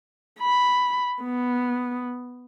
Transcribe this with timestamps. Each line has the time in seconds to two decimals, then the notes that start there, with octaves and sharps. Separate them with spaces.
0.39 B5
1.23 B3